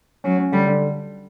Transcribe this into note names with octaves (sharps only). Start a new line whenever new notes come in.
F#3 C#4
C#4
D3 G3
D3